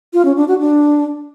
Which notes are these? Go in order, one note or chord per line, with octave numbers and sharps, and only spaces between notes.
F4
C#4
D4
F#4
D4